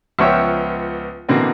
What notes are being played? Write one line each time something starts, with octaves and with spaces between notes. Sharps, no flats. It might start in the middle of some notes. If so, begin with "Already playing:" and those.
C#2 F3 B3 C#5 E5 G5
B2 D3 E3 A#3 C4